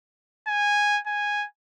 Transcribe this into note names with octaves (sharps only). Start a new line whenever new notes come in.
G#5
G#5